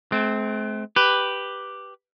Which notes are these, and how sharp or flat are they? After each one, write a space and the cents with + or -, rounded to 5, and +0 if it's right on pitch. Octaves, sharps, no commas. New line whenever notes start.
A3 -45 C4 +0
G4 +0 B4 +0